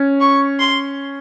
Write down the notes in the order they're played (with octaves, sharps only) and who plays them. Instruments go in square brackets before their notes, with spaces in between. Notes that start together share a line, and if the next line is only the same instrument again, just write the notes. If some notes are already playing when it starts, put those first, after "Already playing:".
Already playing: [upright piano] C#4
[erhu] C#6
C6